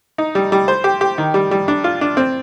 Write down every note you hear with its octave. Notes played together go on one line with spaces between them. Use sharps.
D#4
G3
G3
C5
G4
G4
D#3
G3
G3
D4
F4
D4
C4